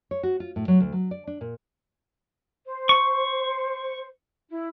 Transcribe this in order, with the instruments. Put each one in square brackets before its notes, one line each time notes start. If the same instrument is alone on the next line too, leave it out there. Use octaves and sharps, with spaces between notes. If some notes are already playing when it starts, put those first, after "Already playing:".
[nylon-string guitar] C#5
F#4
F4
A2
F#3
D2
F#3
D5
D4
A#2
[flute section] C5
[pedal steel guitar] C#6
[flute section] E4